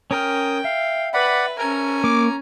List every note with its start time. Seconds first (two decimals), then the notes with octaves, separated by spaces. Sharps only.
0.11 C#4 A#4 G5 D#6 F6
0.64 E5 F5
1.14 B4 D5 F#5 B5
1.58 C#4 A#4 G#5 A#5
2.04 A#3 D6